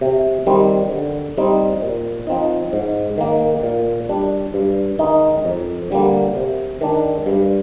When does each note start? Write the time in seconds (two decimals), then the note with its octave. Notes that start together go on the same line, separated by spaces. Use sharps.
0.01 C3
0.46 D#3 G3 C4
0.92 D3
1.37 G3 C4 D#4
1.82 A#2
2.27 F3 C4 D#4
2.73 G#2
3.18 D#3 A#3
3.63 A#2
4.09 G3 D4
4.54 G2
4.99 D#3 G#3 D#4
5.45 F2
5.90 D3 G3 A#3
6.36 C3
6.81 D#3 G#3 D4
7.26 G2